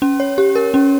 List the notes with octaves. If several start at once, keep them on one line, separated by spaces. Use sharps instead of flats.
C#4
C#5
G4
A#4
C#4